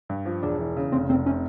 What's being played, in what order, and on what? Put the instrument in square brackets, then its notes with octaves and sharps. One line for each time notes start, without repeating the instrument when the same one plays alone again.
[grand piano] G2
F3
[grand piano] E1 [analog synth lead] D4
[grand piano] E3
C#3
[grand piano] F1 [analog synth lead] C4
[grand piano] F1 [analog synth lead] C4
[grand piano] C3 [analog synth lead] C#4